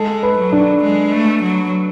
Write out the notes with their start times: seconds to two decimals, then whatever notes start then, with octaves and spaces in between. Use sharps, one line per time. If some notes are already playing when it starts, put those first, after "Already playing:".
Already playing: G#3 A4
0.23 B4
0.38 F#3
0.52 D4
0.83 G#3
1.12 A3
1.43 F#3